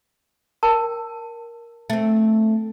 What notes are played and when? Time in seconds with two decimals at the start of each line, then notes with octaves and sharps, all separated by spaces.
0.63 A#4 G5 A5
1.90 A3 C4